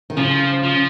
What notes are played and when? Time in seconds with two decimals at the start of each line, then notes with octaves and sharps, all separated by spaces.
0.10 D#3
0.17 C#3 F3
0.64 F3